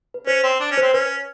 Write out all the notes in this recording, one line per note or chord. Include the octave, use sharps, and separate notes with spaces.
B4
C#4 C5
C4
D4
C#4
C5
C4
C#4 B4